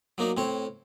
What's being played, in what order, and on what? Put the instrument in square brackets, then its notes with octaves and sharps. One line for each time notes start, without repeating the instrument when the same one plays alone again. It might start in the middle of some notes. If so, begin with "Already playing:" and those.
[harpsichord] F#3 A#3 D#4 D5
A2 C4 C#5